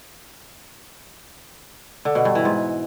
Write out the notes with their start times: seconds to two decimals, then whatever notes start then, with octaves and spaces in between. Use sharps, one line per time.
2.05 D3
2.15 B2
2.25 G2
2.35 E3
2.45 G#2